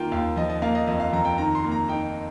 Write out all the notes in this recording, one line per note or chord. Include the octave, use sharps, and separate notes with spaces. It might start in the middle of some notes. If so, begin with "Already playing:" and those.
Already playing: D#3 A#3 F4 G5
D#2 F5
F3 D#5
D#5
A#3 F5
D#5
F2 D#5
F5
F2 A#5
G5
D#3 A#5
C6
A#3
A#5
D#4 G5